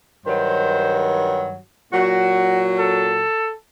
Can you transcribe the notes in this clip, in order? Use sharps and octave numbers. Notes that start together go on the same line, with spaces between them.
G2 D#3 F#3 C5
A#2 F#3 F#4
A4